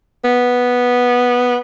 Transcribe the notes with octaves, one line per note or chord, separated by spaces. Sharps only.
B3